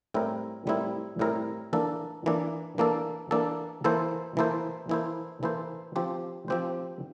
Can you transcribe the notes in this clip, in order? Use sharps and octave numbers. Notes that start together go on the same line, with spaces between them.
A2 G3 C4 E4 A#4
A2 G3 C4 E4 A#4
A2 G3 C4 E4 A#4
E3 A#3 D4 A4
E3 A#3 D4 A4
E3 A#3 D4 A4
E3 A#3 D4 A4
E3 A#3 E4 A4 C5
E3 A#3 E4 A4 C5
E3 A#3 E4 A4 C5
E3 A#3 E4 A4 C5
F3 C4 G4 C5
F3 C4 G4 C5